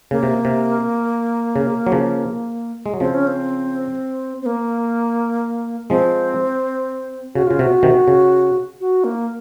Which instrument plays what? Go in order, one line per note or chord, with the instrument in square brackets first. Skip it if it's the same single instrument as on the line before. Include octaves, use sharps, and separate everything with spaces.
[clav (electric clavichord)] C#3 [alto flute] A#3
[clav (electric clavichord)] C3
C3
C#3
F#3
C#3 F3
G#3
F#3
[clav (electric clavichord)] C#3 F3 [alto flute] C4
[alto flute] C#4
C4
C4
A#3
[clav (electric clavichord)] F3 G#3 [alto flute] C4
[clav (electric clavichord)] C#3 [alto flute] F#4
[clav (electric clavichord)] C#3 [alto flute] F4
[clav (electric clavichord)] C3 [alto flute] F#4
[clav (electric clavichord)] C3 D#3
C#3
[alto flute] F#4
A#3